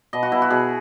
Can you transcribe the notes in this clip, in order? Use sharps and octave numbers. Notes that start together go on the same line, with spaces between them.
B2 D#5
F#4
B2 E4
F#4
B2 G#4